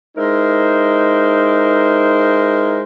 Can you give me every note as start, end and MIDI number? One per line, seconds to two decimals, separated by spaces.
0.17 2.82 56
0.17 2.82 63
0.17 2.82 64
0.17 2.82 70
0.17 2.82 72